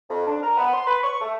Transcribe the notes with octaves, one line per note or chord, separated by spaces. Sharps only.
F2
D4
A#4
B3
C6
B4
C#6
A3